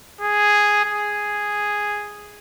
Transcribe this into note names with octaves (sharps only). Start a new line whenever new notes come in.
G#4
G#4